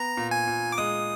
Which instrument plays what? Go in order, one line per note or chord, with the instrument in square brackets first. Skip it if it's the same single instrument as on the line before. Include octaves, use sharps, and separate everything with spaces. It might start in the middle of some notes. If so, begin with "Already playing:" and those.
Already playing: [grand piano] B3 [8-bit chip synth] A#5
[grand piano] A#2
[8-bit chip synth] G#5
[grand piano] A#2
[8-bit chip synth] D6
[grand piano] G#3 [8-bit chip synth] D#6